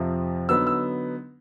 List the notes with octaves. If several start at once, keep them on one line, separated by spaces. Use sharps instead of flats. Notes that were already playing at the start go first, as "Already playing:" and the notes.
Already playing: F2 C3 F3
D3 F#3 B3 D#4 E6
E6